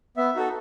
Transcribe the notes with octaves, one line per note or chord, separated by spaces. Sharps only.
B3 E5
D#4 F#4 A4